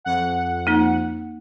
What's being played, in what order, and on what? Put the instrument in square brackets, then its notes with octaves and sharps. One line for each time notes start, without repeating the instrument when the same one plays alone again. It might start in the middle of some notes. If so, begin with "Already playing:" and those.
[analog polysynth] F2 F#5
[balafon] A#3 D#4